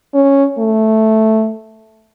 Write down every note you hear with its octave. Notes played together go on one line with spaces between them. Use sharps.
C#4
A3